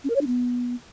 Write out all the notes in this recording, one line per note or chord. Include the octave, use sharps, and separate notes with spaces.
C#4
A#4
C#5
D4
B3